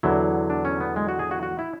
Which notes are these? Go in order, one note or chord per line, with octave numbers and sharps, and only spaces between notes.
E2 D3 F#3 E4
D4
C#4
B3
G#3
F#4
G#4
F#4
F#4
E4